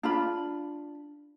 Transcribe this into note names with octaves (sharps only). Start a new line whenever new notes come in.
D4 F4 B5